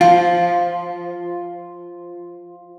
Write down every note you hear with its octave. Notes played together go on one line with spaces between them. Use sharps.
F3 F4 F5